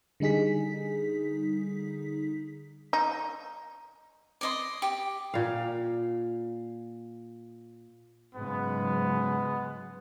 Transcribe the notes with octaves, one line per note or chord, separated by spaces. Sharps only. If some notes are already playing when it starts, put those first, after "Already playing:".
D3 G3 D#4 G#4 B6
D#4
D5 D#5 C6
G4
A#2 F5
G#2 C#3 F#3 G#3 B3